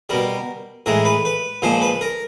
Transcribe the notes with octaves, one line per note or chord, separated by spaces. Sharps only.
B2 G3 A#4
A2 E3 G#3 A#4
B4
B4
A#2 F3 G#3 C5
B4
A#4